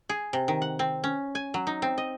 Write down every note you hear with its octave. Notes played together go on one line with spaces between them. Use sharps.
G#4
C3
D#3
F#5
C4
C#4
G#5
F#3
D#4
C4
D#5